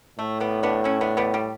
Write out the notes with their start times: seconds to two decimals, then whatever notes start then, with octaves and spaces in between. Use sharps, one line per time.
0.19 A2 A3
0.40 G3 B3
0.63 B3 D4
0.84 C#4 E4
1.01 B3 D4
1.17 G3 B3
1.34 G3